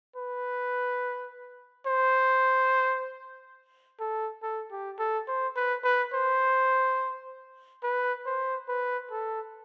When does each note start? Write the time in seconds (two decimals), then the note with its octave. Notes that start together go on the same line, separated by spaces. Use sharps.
0.16 B4
1.87 C5
4.00 A4
4.43 A4
4.71 G4
4.99 A4
5.28 C5
5.56 B4
5.84 B4
6.13 C5
7.83 B4
8.26 C5
8.68 B4
9.11 A4